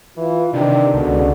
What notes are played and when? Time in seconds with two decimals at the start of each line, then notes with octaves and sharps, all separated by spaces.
0.18 E3 F4
0.53 C3 D#3 D4
0.94 C#2 B2 D3